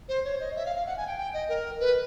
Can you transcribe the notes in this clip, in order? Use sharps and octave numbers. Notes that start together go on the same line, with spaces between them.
C5
C#5
D#5
E5
F5
F5
F#5
G#5
G5
G5
D#5
A#4
B4